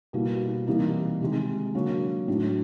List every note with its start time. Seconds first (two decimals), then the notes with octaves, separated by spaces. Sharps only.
0.13 B2 G3 A#3 E4
0.41 E4
0.67 C3 E3 G3 A#3 D#4
1.21 C3 D#3 G#3
1.74 D3 F#3 A#3
2.28 A2 F#3 A3 D4